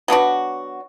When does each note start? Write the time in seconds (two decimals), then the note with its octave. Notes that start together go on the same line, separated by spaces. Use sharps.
0.08 F#3 B3 D4 F#4